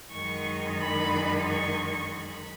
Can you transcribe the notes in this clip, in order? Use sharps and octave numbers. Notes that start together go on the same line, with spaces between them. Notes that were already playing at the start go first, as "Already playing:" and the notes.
F#2 D#3 G#3 D#4 C#6
B5
C#6
B5